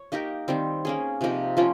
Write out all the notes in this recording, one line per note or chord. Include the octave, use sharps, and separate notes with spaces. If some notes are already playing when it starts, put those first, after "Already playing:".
Already playing: C#5
A#3 D#4 G4 A#4
D#3 G3 C4
A#3 C#4 G#4
C3 F3 A#3 D#4
F3 A#3 C#4 F4